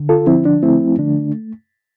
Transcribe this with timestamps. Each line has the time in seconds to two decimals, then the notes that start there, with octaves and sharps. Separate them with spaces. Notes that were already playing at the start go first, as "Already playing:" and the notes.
Already playing: D3
0.09 F4 A4
0.27 F3 C4 E4
0.45 D4
0.63 A3 C4 E4
0.99 D3 D4